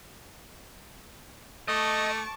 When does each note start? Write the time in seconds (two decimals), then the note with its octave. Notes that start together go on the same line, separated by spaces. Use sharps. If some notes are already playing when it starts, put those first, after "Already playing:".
1.68 A3 D#5 A5 C#6 D6